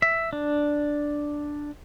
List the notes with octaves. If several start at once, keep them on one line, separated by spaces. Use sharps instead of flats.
E5
D4